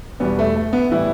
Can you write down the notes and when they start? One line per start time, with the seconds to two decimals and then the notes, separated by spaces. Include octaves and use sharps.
0.20 E2 B2 G3 B3
0.39 A3
0.56 A3
0.73 B3
0.91 A2 E3 G3 E4